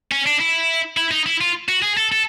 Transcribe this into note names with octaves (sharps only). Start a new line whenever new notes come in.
C#4
D4
E4
E4
D#4
E4
F4
F#4
G#4
A4
A4